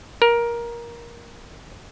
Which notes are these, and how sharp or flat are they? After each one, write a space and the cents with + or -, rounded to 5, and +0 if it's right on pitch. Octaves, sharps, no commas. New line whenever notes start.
A#4 +15